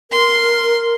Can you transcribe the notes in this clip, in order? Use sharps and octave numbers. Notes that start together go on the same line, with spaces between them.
A#4 C6